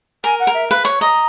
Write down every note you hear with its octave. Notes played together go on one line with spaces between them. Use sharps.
A#4 G#5
F#5
A#4
E5
B4 F5
C#5
D#5 A#5